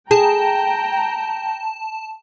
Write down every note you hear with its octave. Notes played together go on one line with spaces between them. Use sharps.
G#4 G5 A5 A#5